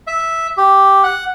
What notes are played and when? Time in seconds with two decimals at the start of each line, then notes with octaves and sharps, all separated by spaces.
0.07 E5
0.57 G4
1.04 F#5